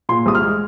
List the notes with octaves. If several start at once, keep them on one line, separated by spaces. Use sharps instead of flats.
A#2 C6
C2 D#6
F6
G#3